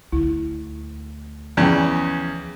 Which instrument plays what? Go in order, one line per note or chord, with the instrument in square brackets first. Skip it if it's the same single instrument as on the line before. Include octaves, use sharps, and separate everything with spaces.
[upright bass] D2 [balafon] E4
[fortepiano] E2 C#3 [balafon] F3 G5